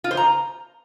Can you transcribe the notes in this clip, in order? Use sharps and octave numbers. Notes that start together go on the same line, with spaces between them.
F4
C5
A#5